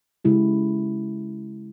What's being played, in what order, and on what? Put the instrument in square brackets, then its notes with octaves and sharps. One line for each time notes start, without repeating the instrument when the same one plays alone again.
[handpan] C#3 G#3 E4 G4